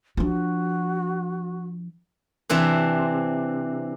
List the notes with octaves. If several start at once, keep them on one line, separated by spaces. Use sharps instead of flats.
F3 D4 F#4
C3 E3 C4 D4